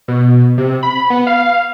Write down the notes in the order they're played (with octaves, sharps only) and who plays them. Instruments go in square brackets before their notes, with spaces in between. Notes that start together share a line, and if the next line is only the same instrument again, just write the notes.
[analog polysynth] B2
C3
B5
B3
F5